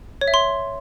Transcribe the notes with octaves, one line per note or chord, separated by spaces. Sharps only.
C#5
E5
C6